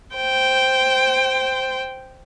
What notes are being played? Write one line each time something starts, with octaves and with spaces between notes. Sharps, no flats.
C5 G5